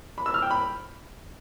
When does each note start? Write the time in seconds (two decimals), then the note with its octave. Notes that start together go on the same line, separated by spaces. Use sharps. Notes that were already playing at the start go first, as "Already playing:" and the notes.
0.18 B5
0.26 E6
0.34 F6
0.42 G5
0.51 B5